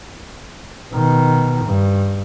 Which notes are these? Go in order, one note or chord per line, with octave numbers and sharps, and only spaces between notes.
B2 D#3
G2